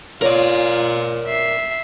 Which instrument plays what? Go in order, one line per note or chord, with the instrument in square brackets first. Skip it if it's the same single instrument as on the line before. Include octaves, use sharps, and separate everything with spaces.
[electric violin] F4 [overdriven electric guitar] A#4 D5 [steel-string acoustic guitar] C#5
[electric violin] E5 C7